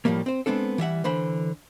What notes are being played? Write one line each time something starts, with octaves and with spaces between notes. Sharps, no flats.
A2 F3 G3 A3 A#3
C4 C5
G#3 B3 C4 D4 A4
E3 G3 E5 F#5
D3 E3 C5 B5